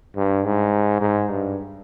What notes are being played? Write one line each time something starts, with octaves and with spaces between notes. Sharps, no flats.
G2
G#2
G#2
G2